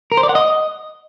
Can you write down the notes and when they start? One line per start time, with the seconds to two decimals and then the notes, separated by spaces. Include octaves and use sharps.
0.12 A#4
0.17 C5
0.23 D5
0.29 F#5
0.35 D#5